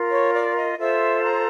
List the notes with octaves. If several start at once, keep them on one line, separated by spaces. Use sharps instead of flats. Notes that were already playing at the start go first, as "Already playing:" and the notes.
Already playing: F4 A#4
C#5
D5
D#5
F4 A4 C5 E5
A#5